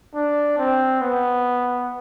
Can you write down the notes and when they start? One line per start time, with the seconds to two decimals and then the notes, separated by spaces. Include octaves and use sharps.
0.15 D4
0.58 C4
1.01 B3